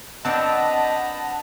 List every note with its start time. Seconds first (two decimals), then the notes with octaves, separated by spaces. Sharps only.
0.25 C4 D4 B4 D#5 F#5 A5 A#5